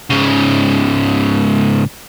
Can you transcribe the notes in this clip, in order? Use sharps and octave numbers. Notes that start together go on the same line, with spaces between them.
G#2 C#3